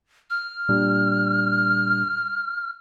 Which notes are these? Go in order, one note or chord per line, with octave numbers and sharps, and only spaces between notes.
F6
A#2 G3 D4